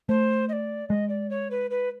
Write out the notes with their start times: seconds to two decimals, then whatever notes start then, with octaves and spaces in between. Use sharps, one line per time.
0.09 A3 C5
0.49 D#5
0.53 D5
0.89 G#3 D#5
1.09 D5
1.30 C#5
1.51 B4
1.71 B4